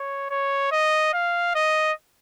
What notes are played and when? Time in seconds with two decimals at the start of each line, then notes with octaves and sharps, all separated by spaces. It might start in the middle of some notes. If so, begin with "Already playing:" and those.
Already playing: C#5
0.30 C#5
0.72 D#5
1.13 F5
1.55 D#5